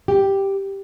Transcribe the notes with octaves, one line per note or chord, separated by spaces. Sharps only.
G4